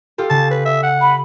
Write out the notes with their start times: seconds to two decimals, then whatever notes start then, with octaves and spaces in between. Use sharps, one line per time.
0.18 F4 G4 A4
0.30 C#3 A5
0.51 B4
0.65 E5
0.83 F#5
1.01 B5